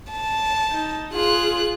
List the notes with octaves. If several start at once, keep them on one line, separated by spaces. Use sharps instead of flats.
A5
D#4
F4 G#4 F#6